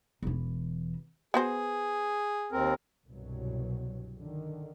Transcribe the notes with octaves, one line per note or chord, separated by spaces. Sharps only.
E1 E3
B3 F#4 G#4 C5
D#2 C4 A#4
C2 G2 B2 F#3
D3 D#3